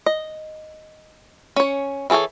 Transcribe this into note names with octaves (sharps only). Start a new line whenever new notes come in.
D#5
C#4 C#5
E3 G#4 A4 C#5 G#5